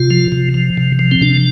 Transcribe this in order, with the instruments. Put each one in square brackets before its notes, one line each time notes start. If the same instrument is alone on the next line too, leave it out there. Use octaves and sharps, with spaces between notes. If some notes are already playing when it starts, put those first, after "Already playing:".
Already playing: [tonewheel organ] C3 F4
F3
C3
F3
C3
F3
C4
C3 D4